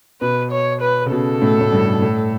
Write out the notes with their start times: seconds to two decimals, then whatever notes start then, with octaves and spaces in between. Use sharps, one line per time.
0.21 B2 B4
0.52 C#5
0.82 B4
1.06 C#3
1.12 B2 A4
1.42 A2
1.61 A2
1.72 G2
2.02 A2